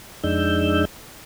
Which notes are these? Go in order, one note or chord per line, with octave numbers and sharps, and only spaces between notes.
F2 G#3 D4 D#4 E6 G6